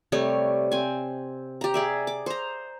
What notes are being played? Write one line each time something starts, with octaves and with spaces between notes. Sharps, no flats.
C3 G3 A3 C#5
C4 G#5
G4 A#5
G#4 D5 E5
D6
C5 A#5